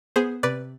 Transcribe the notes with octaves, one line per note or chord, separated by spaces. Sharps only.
B3 G#4 C5
C3 B4 D5